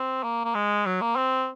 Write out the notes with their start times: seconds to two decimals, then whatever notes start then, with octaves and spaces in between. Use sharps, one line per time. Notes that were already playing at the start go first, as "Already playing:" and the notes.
Already playing: C4
0.24 A#3
0.45 A#3
0.55 G#3
0.86 F#3
1.01 A#3
1.16 C4